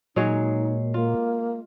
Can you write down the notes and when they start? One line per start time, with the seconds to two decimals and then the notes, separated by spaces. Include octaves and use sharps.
0.16 A#2 F#3 G#3 D#4 C#5
0.94 A#3 F4